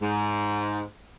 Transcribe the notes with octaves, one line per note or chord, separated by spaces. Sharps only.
G#2